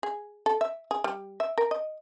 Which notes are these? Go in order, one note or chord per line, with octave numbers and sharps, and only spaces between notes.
G#4
A4
E5
G#4
G3
E5
A#4
D#5